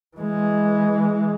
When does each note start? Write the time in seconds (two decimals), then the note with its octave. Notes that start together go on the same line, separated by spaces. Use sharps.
0.17 E3 G#3